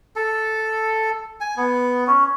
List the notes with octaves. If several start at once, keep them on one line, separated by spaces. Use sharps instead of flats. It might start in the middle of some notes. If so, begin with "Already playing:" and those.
A4
G#5
B3
C#4